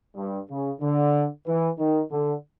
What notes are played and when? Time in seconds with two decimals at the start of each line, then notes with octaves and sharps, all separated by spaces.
0.16 G2
0.49 C#3
0.81 D3
1.47 E3
1.79 D#3
2.11 D3